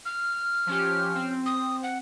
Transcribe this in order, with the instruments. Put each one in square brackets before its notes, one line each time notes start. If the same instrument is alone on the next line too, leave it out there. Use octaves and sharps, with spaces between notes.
[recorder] F6
[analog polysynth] F3 C#4 G4
C4
[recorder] D#6
F#5